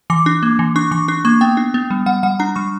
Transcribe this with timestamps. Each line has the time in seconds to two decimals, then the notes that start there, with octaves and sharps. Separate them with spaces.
0.10 E3 D6
0.26 D4
0.43 A#3
0.59 E3
0.76 D4 C#6
0.91 E3 C#6
1.08 D4 C#6
1.25 A#3 C#6
1.41 B3 G5
1.57 D4
1.74 B3
1.90 G3
2.06 G3 F#5
2.23 G3 F#5
2.39 D4 A#5
2.56 G3 C#6